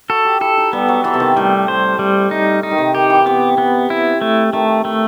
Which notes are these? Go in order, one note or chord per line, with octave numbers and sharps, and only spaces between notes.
F#4 A4
G4
E4 A4
D#4
G3 B3
F#3
E3 A4
C3
D#3
A2 G3
C5
G3
D#4
D#4
D#3
C3
D#3 G4
E3
C3 B3
B3
E4
A3
D#3 A3
A3